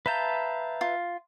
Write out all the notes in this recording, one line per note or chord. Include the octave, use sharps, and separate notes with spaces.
B4 E5 F5 A5 A#5 G6
F4